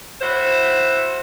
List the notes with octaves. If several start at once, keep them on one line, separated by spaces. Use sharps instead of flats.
A2 E4 F#4 C5